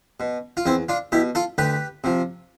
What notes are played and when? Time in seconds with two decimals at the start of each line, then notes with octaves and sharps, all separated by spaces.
0.20 B2
0.57 F4
0.66 E2 C4 E4
0.89 D4 F4
1.12 B2 E4 G4
1.35 F4 A4
1.58 D2 G4 B4
2.04 C3 F3